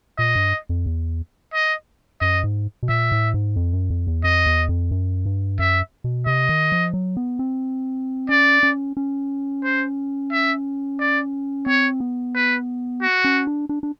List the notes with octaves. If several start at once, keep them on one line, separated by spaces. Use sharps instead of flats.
A#2 D#5
G2
F2
E2
D#5
F#2 D#5
G#2
B2
A#2 E5
A2
G#2
F2
F#2
F2
E2
F2 D#5
E2
F2
F#2
G2
F#2 E5
B2
C3 D#5
D#3
F3
F#3
B3
C4
C#4 D5
C#4
C#4
C5
E5
D5
C4 C#5
B3
B4
F#4
C#4
D4
D4
D4